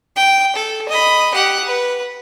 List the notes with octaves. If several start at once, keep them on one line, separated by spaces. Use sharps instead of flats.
G5
A4
D#5 B5
G4 F#5
B4